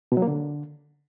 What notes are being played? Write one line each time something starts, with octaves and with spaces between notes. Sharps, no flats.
B2
F#3
A#3
D3